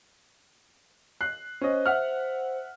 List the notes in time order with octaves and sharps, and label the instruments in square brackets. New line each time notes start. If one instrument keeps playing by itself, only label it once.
[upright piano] F#6 C7
[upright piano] C#4 D#5 [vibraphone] C5
[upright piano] E5 F#5 F6